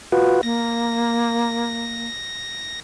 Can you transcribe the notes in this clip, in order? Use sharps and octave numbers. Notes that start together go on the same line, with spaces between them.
F4 F#4 B4
A#3 A#6